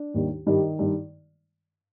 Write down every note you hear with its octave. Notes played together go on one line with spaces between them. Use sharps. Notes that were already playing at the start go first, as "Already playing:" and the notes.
Already playing: D4
D#2 D#3 G3
G2 D#3 G3 D#4
G2 D#3 G3